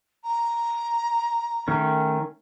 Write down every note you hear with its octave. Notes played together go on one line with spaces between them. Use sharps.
A#5
D#3 A3 C#4